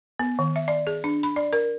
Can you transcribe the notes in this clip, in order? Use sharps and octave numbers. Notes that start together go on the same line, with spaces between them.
B3
D#3
E5
D5
G#4
D4
B5
D5
A#4